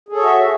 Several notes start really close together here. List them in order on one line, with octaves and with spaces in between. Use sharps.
G#4 A4 C#5 F#4 E5